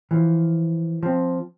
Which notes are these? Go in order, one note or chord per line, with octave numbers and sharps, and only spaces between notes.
E3 F3
F3 C4